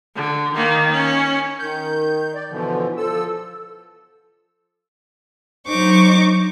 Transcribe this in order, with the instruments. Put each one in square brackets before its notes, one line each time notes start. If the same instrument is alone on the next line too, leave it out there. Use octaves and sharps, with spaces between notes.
[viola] D3
D#3 A#3
C#4
[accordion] D#3 G6
D5
B2 D3 E3 F3
F3 A4 E6
[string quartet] F#3 D#4 C5 C#6 D6